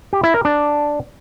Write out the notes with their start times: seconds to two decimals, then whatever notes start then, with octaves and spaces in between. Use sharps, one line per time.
0.13 G4
0.23 E4
0.34 A#4
0.45 D4